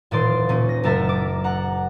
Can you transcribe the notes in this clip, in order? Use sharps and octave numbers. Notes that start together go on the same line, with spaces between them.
D#1 A#2 E3 D5 C6
A#2 C#4
A#6
F#1 A3 A4 A#4 E5 A#5
D6
F#5 A#5